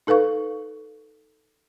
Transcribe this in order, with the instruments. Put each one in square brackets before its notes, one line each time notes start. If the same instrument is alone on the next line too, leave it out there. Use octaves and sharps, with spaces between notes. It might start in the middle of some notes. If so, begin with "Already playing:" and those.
[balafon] D#4 A4 B4 F5 C#6